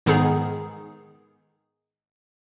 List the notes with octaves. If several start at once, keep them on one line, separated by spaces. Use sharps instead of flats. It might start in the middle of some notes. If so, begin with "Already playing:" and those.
G#2 D#3 B3 D#4 G#4